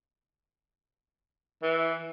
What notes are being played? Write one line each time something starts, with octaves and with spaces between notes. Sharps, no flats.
E3